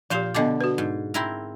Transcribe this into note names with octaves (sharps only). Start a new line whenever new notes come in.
A#2 F3 G4 C5 F5
B2 D3 B3 D#5 D6
F#4 B4
G#2
C4 E4 A#4